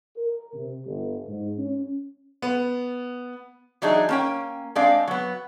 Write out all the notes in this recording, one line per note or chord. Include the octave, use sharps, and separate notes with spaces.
A#4
C3
G1
G#2
C#4
B3
E3 F#3 D4 D#4 G#4
A#3 C#4 G5
G#3 C4 D4 D5 F5
F#3 B3